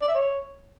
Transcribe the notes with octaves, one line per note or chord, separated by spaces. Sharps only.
D5
E5
C#5